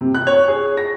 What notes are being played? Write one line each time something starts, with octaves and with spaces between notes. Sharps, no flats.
C3
F#6
C#5
G#4
A#6